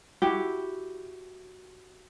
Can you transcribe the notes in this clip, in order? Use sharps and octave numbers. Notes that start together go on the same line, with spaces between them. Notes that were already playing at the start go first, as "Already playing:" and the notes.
E4 F#4 G4